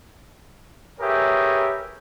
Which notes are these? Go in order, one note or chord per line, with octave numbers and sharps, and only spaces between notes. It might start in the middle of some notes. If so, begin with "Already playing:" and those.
G4 G#4 A#4 B4 C#5 E5